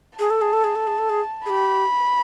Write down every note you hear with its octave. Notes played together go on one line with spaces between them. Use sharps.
G#4 A5
A4
G#4
A4
G#4
A4
G#4
A4
G#4
G4 G#4 B5